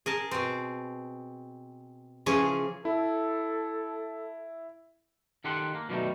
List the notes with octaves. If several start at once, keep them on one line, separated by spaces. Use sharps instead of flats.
G#4 A#4 A5
B2 C4
C#3 E3 F3 C#4 G#4
E4 A4
D#3 G4 A4 F#5 C6
A#3
B2 D#3 F#3 G3 A3 D#4